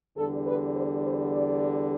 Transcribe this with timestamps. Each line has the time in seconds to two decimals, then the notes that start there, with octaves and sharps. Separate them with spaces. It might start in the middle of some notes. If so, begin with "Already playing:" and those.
0.17 E2 D3 G3 A4
0.46 B4
0.75 C5
1.04 C5
1.32 D5